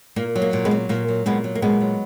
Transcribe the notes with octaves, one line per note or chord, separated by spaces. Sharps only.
A#2 A#3
F#3
A#3
A#2
G#3 B3
F#3
A#2 A#3
F#3
A#2 G#3 B3
F#3
A#3
A#2 G#3 B3
F#3